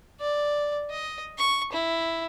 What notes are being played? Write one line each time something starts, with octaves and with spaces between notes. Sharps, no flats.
D5
D#5
C#6
E4